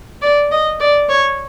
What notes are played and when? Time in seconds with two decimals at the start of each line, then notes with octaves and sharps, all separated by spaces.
0.22 D5
0.51 D#5
0.80 D5
1.09 C#5